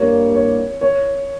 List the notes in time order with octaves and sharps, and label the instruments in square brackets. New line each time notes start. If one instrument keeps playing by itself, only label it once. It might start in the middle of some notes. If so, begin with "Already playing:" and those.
Already playing: [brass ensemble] G2 G3 A#3 [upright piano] C#5
[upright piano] C#5
C#5